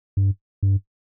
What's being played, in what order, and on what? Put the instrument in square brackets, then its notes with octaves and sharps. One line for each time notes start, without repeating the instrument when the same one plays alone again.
[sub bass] G2
G2